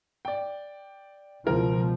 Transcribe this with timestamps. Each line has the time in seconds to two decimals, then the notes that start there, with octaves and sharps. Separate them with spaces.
0.25 D5 G5
1.47 C#2 B2 F3 A#4